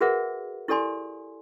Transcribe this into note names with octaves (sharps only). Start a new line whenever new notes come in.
F#4 G#4 A#4 B4 E5 F#5
E4 G4 A4 D5 G#5 C6